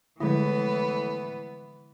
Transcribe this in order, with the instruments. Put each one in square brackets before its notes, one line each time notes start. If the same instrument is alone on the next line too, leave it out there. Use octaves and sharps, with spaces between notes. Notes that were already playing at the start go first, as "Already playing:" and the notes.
[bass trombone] A2 [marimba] D3 F3 G3 [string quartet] E3 B3 [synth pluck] G#3 E4